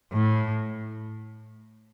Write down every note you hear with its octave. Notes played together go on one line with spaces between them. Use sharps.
A2